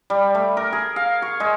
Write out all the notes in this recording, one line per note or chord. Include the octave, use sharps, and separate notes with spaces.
G3
A3
A#4
G#4
F5
C#6
G#3